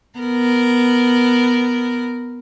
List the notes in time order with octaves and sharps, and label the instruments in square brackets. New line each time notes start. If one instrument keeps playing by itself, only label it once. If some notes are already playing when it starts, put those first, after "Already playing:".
[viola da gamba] B3 A#4